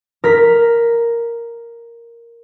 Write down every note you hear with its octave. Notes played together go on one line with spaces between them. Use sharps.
A#4 B6